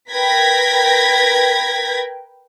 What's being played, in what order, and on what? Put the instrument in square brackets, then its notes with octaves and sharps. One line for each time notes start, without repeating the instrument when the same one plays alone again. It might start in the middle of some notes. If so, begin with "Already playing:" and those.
[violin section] A#4 B4 G5 G#6 A#6 B6